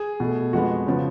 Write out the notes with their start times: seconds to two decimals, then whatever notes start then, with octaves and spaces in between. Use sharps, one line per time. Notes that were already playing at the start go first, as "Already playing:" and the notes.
Already playing: G#4
0.20 B2 A3
0.53 F2 F3 G#3 B3 F#4
0.87 C#3 F3 B3